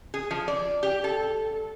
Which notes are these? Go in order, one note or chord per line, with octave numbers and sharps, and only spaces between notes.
G#4
F3
D5
G4
A4